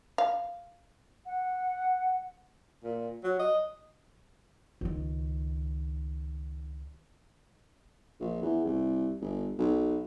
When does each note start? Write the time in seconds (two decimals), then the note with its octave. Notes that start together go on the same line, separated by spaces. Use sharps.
0.18 F5
1.26 F#5
2.84 A#2
3.23 F#3
3.39 D#5
4.81 C#2 D#3
8.20 A#1
8.42 E2
8.65 C2
9.21 G1
9.59 B1